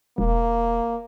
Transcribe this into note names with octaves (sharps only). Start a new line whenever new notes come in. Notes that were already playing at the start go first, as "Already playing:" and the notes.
E1 A#3